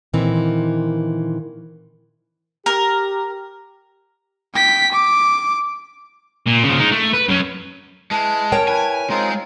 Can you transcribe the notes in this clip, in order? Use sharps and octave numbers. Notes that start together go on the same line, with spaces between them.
A#2 D#3 E3 C4
G4 A#4
G5 B6
D6
A#2
C#3 F3
G#3 D#4
A3
B4
F#2 C#4
G#3 E4 B4 A5 F6
C#4 A#4 C#5 G5
E4 B4 G#5
G#3 C4 D#4 F4 G#4